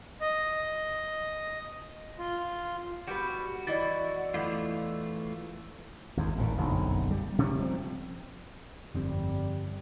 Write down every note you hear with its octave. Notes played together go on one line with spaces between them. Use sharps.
D#5
F4
G3 B3 F#4
E3 D5 D#5 A6
E2 E3 A3 F4
G#1 E2
A1 D#2 A#2
F#1 B1 F2 D3
G3
C3 G3 C#4
F3 C4
G1 F2 G3 C4